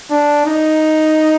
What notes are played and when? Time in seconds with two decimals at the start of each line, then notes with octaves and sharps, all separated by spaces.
0.10 D4
0.45 D#4